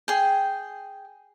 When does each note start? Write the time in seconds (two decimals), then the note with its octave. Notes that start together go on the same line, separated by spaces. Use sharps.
0.08 G#4 G5